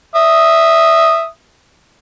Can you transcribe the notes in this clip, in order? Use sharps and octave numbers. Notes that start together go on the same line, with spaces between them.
E5 D#6